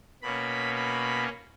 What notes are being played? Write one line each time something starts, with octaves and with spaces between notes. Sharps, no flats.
B2 A#3 C#4 B5
B5